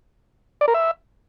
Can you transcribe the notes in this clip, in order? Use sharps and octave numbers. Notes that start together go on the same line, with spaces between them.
D5
A#4
E5